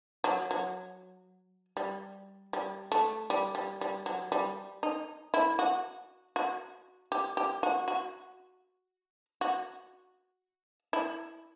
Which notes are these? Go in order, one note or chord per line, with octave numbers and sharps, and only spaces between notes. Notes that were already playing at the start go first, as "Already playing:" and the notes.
F#3
F#3
G3
G3
A3
G3
G3
G3
F#3
G3
D#4
E4
F#4
F#4
G4
G4
F#4
F#4
F#4
E4